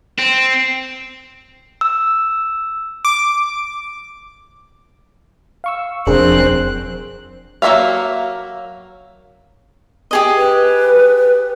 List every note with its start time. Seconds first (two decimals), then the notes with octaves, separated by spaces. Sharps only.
0.19 C4
1.81 E6
3.05 D6
5.64 F5 C#6 E6
6.07 E1 F2 C4 D4 G#4 A#4 F#6
7.62 F#3 A#3 C#5 E5 F5
10.11 G4 G#4 D#5
10.36 B4